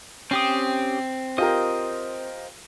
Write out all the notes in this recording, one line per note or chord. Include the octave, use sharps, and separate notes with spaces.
C4 C#4 G4 D#6
F4 G4 A#4 C5 D#5